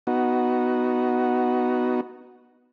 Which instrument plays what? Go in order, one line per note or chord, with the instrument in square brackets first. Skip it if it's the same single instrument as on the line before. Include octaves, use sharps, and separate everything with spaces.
[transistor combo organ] B3 D#4 F#4